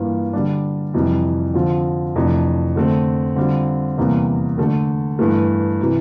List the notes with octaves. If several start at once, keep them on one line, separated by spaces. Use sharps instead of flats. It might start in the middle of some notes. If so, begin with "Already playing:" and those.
Already playing: G2 E3 A#3 F4
D3 G3 D4
F2 C3 E3 G3
D3 F3 C4 F4
F2 C3 E3 A3 D4
D3 A3 C4
D3 G3 C4 F4
E2 C3 G3 A#3
D3 A3 D4
G2 E3 A3
C3 E3